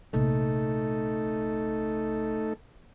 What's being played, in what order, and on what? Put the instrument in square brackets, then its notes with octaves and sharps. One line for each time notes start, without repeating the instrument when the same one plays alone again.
[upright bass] A#1 C3 [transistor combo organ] A3 D#4 A4